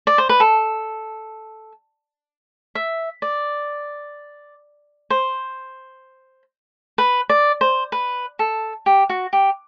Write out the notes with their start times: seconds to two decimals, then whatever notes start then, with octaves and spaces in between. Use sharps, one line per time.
0.07 D5
0.18 C5
0.29 B4
0.40 A4
2.75 E5
3.22 D5
5.10 C5
6.98 B4
7.30 D5
7.61 C5
7.92 B4
8.39 A4
8.86 G4
9.09 F#4
9.33 G4